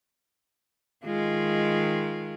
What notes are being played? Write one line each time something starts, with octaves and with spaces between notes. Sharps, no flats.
D#3 G#3 F4